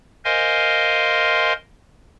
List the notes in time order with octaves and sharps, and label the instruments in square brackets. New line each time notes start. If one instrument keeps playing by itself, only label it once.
[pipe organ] A#4 C5 D#5 F5 G#5 C6